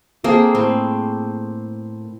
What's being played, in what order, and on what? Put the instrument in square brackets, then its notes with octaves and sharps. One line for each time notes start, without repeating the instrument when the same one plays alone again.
[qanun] A#3 C4 G#4 [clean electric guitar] A4
[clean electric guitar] A2 [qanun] C4